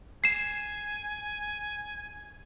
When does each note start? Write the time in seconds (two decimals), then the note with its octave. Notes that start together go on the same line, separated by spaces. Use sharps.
0.24 G#5 C7 E7